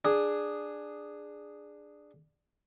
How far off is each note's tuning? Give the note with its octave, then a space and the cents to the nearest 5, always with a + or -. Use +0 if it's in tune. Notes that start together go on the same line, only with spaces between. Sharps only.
D4 +10 G#4 +0